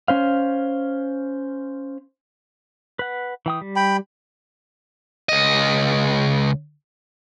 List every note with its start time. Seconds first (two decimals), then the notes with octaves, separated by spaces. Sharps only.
0.08 C#4 C5 F5
2.99 B4 F#5
3.46 E3 G5 D#6
3.61 G3
3.76 G5 B5
5.29 C#2 D#5